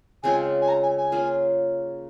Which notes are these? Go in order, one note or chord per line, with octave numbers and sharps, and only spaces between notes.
C#3 G#3 C4 F4 G#5
G#5
A#5
G#5
G#5
A#3 C#4 F4 G#4